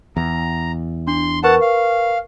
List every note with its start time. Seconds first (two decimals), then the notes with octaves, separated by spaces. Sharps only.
0.16 E2 A#5
1.08 D4 C6
1.44 A#4 B4 F#5 A5 C#6
1.61 F5